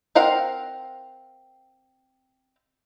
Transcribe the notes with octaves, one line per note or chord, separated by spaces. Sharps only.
C4 A#4 F5 F#5 A#5